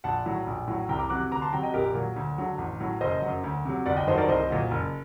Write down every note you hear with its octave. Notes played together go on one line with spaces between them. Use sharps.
A#1 F#5 A5
A2 F#3
A#1
A2 F#3
C2 G5 A#5
A#5 D6
C3 F#3 D6 F#6
D2 A#5 D6
A5 C6
C3 F#3 G5 A#5
D#5 G5
A#1 G4 A#4
A#2 F#3
D2
D3 F#3
A1
A2 F#3
F#1 C5 D#5
F#2 F#3
D2
C3 F#3
G1 D5 F#5
D#5 G5
G2 D#3 F#3 C5 D#5
A#4 D5
C2 C5 D#5
A#2 F#3
F#1